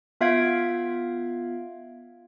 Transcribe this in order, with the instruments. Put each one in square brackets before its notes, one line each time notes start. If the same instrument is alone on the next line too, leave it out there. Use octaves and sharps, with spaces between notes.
[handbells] B3 F4 E5 F5 G#6 D7